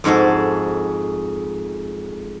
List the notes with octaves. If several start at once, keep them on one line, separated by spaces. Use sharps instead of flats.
F2 G#2 F#4 G#4 A4